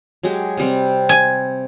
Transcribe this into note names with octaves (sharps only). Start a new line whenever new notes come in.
F#3 G#3 G4
C3 G3 C4
G#5